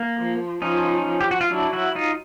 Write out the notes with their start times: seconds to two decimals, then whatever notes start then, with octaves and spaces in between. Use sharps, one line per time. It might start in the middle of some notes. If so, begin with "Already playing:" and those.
Already playing: A#3
0.17 F3
0.62 F3 C#4 D#4
1.07 F3
1.21 G4
1.31 F#4
1.41 F4
1.51 F#3 D4 E4
1.73 E4 F#4
1.95 D#4 F4